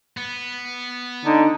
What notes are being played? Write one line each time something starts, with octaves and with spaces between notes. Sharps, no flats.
B3
D3 D#4